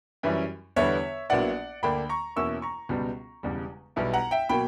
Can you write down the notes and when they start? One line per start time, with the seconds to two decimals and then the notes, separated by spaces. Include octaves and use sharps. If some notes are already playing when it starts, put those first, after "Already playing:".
0.23 F#2 E3 G3 C#4 E4
0.76 E2 D3 G3 B3 C#5 E5
1.30 A#1 A#2 F#3 B3 E4 D5 F#5
1.83 D2 D3 A#3 D4 G5 B5
2.09 A#5 C#6
2.36 E2 B2 A#3 C#4 E4 C#6 E6
2.62 A#5 C#6
2.89 C#2 B2 G3 B3
3.43 E1 E2 C#3 G3
3.96 B1 B2 G3 B3 E4
4.14 F#5 A#5
4.31 E5 G5
4.49 B2 F#3 A#3 G5 B5